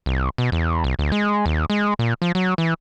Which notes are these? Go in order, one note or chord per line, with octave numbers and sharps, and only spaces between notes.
C2
B2
E2
C2
D2
G#3
D#2
G#3
A#2
F3
F#3
E3